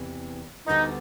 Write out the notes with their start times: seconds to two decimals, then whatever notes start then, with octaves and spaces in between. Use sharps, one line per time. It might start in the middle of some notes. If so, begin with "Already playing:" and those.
Already playing: E2 C3 E3
0.67 D2 D3 G3 B3 D#4